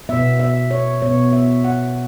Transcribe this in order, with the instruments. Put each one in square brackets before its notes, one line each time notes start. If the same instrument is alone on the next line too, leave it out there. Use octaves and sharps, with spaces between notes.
[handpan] B2 B3 E5
E5
C#5
B2 B3 C#5
E5
F#5